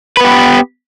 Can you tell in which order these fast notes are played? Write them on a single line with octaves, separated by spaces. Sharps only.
B4 B3 G4